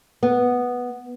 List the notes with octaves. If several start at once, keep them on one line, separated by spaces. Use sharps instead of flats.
B3